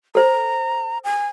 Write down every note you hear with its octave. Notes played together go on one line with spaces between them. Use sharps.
A4 C5 A#5
G#5